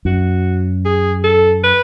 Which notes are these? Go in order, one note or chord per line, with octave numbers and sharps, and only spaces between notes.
F#2 F#4
G#4
A4
B4